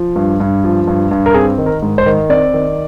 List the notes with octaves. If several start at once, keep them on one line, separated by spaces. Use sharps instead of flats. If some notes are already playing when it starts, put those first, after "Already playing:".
Already playing: F3
G2
G2
F3
G2
G2
A#4
C4 G#4
D#3
A#4
G#2
C5
D#3
C4 D5
D#3